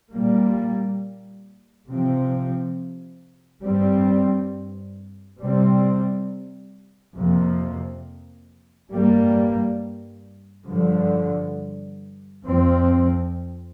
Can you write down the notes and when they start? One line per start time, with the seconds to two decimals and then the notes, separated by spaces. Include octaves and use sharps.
0.12 A#2 G3 A#3
1.88 C3 F3 C4
3.64 G2 G3 C4
5.41 C3 G3 C4
7.16 F2 C3 F3 A#3
8.93 G2 G3 A#3
10.69 G2 D3 F3
12.45 F2 F3 C4